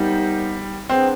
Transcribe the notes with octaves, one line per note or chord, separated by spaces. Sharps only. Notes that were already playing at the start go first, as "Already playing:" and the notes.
Already playing: C3 D#3 G3 B3 D#4
B3 C4 D4 G#4 C5